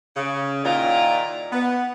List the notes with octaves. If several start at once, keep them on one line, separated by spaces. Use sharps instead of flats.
C#3
A#2 D#3 E4 F4 D5 A#5
B3